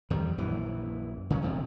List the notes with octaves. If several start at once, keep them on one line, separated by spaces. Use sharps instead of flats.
E2 D#3 G3
A#1 F#2 E3
C#3 F#3 A3 C#4
E1 D2 C3